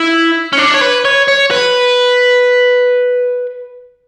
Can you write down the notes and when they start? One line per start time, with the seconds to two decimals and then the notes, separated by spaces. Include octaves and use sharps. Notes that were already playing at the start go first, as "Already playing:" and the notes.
Already playing: E4
0.53 C#4
0.58 D4
0.74 C#5
0.81 B4
1.05 C#5
1.28 C#5
1.51 B4